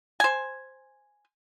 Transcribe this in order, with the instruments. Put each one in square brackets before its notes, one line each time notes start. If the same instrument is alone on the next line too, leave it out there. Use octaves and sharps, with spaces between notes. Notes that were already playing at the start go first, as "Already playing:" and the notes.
[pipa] C5 G#5